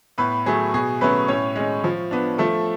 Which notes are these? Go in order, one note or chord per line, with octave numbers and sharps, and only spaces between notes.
A2 B3 B4
F#3 A3 G#4
B2 G#4
F#3 A3 B3 C#4 B4
A2 C#4 C#5
G#3 C#4
F3
B3 D4
F3 A3 A4